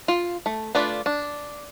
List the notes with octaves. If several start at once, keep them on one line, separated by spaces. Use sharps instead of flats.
F4
A3
A3 D4 F4 B4 D5
D4